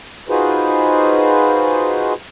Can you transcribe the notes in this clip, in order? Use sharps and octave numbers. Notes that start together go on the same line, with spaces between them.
D#4 F4 F#4 G#4 B4 C5